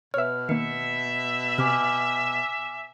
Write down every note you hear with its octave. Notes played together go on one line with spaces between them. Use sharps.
B2 B4 C#5 E5 F6
D#3 A#3 E5 C#7
C3 G#5 D6 F6